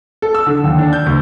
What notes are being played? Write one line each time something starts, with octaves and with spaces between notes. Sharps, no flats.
A4
E6
D3
D#2
D4
G6
D2